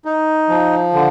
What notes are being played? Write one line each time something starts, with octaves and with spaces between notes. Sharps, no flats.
D#4
F3
D3